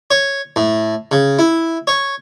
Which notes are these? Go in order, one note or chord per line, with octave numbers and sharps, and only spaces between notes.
C#5
A2
C#3
E4
C#5